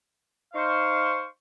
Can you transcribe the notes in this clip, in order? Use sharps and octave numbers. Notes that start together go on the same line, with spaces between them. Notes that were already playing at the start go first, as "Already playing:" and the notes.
D#4 C5 F5 C#6